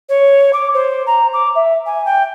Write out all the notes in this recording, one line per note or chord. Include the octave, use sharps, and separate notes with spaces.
C#5
D6
C5
A#5
D6
E5
G#5
G5